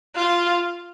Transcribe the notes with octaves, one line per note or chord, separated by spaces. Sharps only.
F4